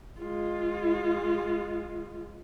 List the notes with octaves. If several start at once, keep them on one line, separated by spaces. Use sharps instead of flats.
G#3 F4